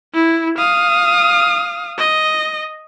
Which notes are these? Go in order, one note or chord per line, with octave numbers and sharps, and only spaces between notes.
E4
F5 D#6
D#5